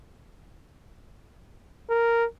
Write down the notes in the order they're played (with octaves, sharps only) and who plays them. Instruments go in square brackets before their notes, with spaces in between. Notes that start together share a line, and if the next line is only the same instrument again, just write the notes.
[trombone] A#4